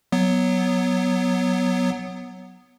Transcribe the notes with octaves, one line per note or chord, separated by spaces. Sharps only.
F#3 B3